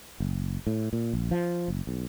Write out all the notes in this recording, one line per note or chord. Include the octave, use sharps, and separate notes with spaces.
F#1
A2
A#2
A#1
F3
F#1
B1